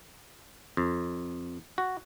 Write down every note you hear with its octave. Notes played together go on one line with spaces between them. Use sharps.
F2
F#4